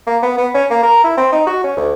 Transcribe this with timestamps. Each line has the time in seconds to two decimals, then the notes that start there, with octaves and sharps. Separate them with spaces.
0.07 A#3
0.22 B3
0.38 B3
0.54 C#4
0.70 A#3
0.83 A#4
1.04 E4
1.17 C4
1.32 D#4
1.46 F#4
1.64 C#4
1.77 D2